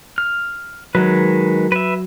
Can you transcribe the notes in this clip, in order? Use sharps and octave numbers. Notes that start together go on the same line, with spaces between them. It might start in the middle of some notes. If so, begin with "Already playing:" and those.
F6
D#3 F#3 G#3 B4
B4 E5